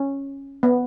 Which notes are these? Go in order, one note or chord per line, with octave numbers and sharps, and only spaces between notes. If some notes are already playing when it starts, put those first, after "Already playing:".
Already playing: C#4
B3